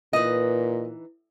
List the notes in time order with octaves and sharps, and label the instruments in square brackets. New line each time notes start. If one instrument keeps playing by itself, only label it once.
[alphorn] A#2 [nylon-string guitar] E3 D#4 B4 [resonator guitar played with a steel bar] D#5